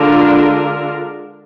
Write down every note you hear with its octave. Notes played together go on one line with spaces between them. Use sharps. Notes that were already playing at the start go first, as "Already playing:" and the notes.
Already playing: D3 G#3 D4 F4 A#4